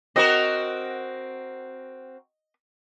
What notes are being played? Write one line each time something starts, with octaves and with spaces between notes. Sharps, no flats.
C4 F#4 A#4 D#5